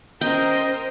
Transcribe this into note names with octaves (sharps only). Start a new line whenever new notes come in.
C#4 A#4 C5 D#5 G5